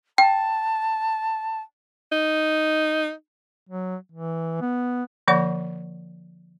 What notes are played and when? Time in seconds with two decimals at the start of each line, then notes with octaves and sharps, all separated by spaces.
0.18 G5 A5
2.12 D#4
3.69 F#3
4.12 E3
4.61 B3
5.28 D3 F3 A#3 D5 F#5 C#6